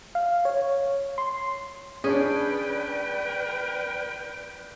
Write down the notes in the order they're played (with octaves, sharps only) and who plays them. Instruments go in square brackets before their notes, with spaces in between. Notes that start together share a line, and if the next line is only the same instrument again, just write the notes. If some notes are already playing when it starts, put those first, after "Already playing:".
[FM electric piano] F5
C#5
C6
[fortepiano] C#4 D4 [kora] G#4 [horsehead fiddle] B4 G5 [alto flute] D5